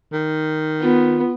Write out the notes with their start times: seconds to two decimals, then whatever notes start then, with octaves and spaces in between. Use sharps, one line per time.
0.12 D#3
0.82 B3 F4